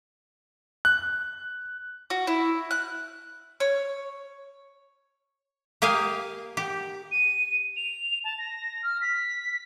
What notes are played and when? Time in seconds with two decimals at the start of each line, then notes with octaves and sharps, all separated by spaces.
0.85 F#6
2.10 F#4
2.27 E4
2.71 F#6
3.60 C#5
5.82 A#3 G4 G#4 F5 G#5
6.57 G4
7.11 D#7
7.76 F7
8.24 A5
8.38 A#6
8.83 F6
9.01 B6